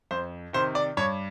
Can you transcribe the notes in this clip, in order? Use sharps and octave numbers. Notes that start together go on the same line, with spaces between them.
F2 C5
C3 D#3 C5
D5
G2 C#5